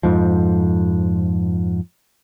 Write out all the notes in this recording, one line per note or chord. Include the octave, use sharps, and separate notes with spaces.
F2 G#2 F3